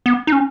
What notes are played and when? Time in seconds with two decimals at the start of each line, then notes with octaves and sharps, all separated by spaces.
0.06 B3
0.27 D#4
0.32 C#4